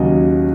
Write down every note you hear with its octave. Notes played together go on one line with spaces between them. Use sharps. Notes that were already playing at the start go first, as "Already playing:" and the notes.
Already playing: D#2 C#3 F#3 D#5